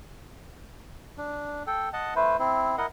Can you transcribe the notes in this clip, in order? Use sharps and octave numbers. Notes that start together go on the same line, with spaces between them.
D4
A4 G5
D#5 F#5 A5
A3 E4 B4 C5
C4 E4
E4 A#4 D#5 F#5